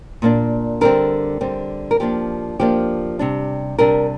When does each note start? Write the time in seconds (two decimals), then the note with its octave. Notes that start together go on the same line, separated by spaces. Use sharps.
0.22 A#2 A#3 D4
0.81 D3 G3 C4 A#4
1.41 D3 G3 C4
1.91 A#4
2.00 F3 A#3 D4 G4
2.60 F3 A#3 D4 G4
3.19 C3 G3 D4
3.79 C3 G3 D4 A#4